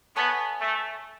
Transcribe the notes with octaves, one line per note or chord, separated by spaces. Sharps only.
B3 A4 C#5 E5 G#5
A3